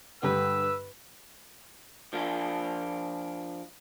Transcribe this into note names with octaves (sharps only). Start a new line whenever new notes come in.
G2 D3 G4 B4 E6
F3 D4 F4